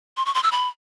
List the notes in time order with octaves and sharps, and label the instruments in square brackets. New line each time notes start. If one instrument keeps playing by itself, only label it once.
[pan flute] C6
C#6
C6
E6
B5